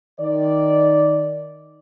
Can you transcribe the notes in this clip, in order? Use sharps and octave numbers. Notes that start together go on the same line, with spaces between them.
D#3 D5